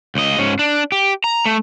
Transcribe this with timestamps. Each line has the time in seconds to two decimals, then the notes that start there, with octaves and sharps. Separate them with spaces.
0.15 C#2 D#5
0.38 G#2 C#4
0.59 D4
0.92 G4
1.24 A#5
1.46 A3